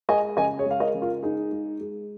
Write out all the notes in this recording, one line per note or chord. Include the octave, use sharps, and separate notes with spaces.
G#3 D#5 G#5
C#3 D#5 G#5
G#4 C#5
G#3 F5
A#4 D#5
C#3
F4 A#4
G#3 D#4 G#4
G#3
G#3